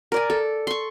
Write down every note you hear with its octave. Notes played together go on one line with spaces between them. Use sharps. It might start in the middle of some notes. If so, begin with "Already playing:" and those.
A#4 D5 G#5
A4
C6 C#6